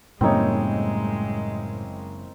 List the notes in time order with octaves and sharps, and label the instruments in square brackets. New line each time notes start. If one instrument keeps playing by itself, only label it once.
[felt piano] F#1 A#3 C#5 [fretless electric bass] A2 G3 [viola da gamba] G#3 [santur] C4 D#4